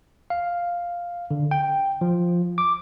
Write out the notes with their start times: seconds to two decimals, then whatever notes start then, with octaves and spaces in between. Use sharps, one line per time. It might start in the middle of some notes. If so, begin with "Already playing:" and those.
0.30 F5
1.31 D3
1.51 G5
2.01 F3
2.58 D6